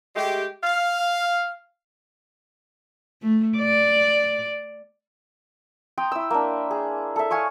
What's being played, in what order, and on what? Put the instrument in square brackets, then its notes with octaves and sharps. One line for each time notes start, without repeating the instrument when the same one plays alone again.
[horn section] G#3 A3 G4
F5
[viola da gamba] A3
D5
[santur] G5 A#5 C6 D#6
E4 E6
A#3 D4
G#4
A4 E5
F5 G#5 C#6 D#6